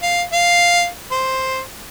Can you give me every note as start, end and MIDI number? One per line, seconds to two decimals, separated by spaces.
0.02 0.22 77
0.32 0.86 77
1.11 1.61 72